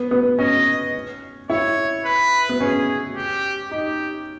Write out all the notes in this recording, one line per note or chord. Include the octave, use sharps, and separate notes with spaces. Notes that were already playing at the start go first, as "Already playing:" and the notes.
Already playing: B3
B3
C#4 D#5
E4 C#5
B4
B3
C#4 G#4
G4
D#4 G4